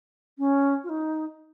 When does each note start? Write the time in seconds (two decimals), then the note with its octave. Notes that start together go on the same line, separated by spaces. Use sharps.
0.38 C#4
0.83 F4
0.89 D#4